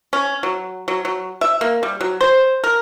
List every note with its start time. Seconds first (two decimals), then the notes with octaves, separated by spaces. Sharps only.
0.13 C#4
0.43 F#3
0.88 F#3
1.05 F#3
1.41 E5
1.61 A#3
1.83 G3
2.01 F#3
2.21 C5
2.64 A#4